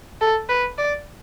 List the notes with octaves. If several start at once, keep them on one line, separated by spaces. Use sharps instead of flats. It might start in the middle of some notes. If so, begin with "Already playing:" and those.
A4
B4
D5